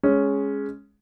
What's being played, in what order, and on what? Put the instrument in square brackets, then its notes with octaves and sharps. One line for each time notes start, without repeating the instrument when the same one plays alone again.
[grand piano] G#3 C#4